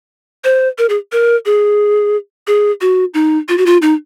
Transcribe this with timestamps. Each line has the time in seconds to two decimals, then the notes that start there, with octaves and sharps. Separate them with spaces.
0.44 C5
0.78 A#4
0.89 G#4
1.12 A#4
1.46 G#4
2.47 G#4
2.81 F#4
3.14 D#4
3.49 F4
3.58 F#4
3.66 F4
3.82 D#4